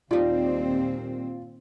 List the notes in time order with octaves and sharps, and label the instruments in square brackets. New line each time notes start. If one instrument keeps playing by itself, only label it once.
[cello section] D#2 A#2 C4 [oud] G3 D#4 [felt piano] F4